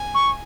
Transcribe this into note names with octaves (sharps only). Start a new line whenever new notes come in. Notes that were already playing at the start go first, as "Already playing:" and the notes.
Already playing: G#5
C#6